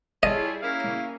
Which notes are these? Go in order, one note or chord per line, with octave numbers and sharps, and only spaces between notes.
G3 E4 F4 G#4 A4 C#5 D#5
A#3 C#4 E4 A#4 F5